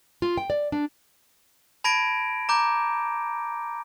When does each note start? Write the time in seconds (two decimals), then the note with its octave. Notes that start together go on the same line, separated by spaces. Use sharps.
0.22 F4
0.38 G5
0.50 D5
0.72 D4
1.84 A5 B5 G#6 A#6 D7
2.49 A#5 D6 G6